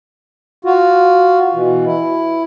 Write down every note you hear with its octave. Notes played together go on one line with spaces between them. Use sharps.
F4 F#4
B2 E3
E4